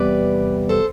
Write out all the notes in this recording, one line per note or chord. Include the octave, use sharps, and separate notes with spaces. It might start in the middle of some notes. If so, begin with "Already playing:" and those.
Already playing: E2 C3 G3 B3 B4 D5
A4 C5